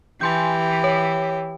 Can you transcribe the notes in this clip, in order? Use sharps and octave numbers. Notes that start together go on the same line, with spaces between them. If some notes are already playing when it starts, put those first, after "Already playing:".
E3 G4 G#5 C6 G6
C#5